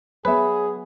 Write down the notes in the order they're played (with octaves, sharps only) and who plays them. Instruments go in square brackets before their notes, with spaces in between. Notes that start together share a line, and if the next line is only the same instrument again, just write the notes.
[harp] F#3 B3 [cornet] G#4 [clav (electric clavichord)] B4 [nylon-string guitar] C#5 E5